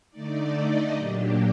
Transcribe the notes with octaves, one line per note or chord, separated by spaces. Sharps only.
D3 A3 D#4 D5
D#5
A#2 F#3 A#3 D4 G4